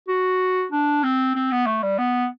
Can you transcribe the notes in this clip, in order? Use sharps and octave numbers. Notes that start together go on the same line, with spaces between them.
F#4
D4
C4
C4
B3
A3
G3
B3